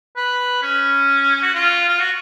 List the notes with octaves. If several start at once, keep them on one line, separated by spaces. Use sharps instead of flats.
B4
C#4
F#4
F4
F4
F#4